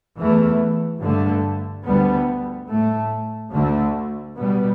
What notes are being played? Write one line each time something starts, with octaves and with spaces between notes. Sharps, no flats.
E2 E3 A3
G2 D3 A3
D2 D3 G3 B3
A2 A3
D2 D3 A3
B2 G3 B3